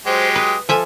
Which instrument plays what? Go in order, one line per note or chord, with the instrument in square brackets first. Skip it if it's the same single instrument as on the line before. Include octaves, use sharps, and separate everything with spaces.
[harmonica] F#3 G#3 G4 [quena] C5
[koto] B4 [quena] D#6
[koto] F3 E5 G#5 [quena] A4